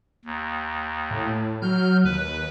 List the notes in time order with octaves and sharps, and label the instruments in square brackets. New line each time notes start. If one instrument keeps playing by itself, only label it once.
[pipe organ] D#2
[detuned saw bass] A2
[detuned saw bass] F#3 [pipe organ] F6 G6
[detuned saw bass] D#2 [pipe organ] B4